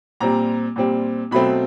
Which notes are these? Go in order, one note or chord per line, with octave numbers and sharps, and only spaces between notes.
A#2 G3 C4 A#5
A#2 G3 C4
B2 F#3 A3 C4 B5